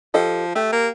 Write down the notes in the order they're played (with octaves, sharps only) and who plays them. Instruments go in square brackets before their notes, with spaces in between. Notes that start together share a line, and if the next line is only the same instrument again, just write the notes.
[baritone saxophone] F3 [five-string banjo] G4 A4 D#5
[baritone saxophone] A3 [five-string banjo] G4
[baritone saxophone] A#3